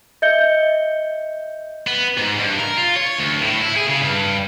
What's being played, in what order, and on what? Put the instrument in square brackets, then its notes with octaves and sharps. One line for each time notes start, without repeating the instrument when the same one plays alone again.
[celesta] D#5 E5 G6 C#7 G7
[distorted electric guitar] B3
G#2
G2
A#4
F4
C#5
D2
A2
E4
G#4
C#3
G2